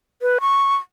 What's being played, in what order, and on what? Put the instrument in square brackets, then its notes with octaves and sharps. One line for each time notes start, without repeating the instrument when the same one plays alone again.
[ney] B4
C#6